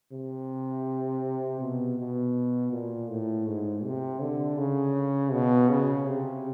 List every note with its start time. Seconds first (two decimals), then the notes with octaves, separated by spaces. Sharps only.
0.12 C3
1.61 B2
1.98 B2
2.72 A#2
3.09 A2
3.47 G#2
3.84 C3
4.21 D3
4.58 C#3
5.32 B2
5.69 C#3
6.07 C3